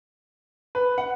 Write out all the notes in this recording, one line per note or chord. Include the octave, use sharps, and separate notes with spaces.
B4
F#5